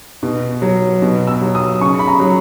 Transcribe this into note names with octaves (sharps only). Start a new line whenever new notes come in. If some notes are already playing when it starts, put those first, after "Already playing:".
B2
F#3
B2
E6
F#3
D#6
C#3 C#6
B5
A#5
F#3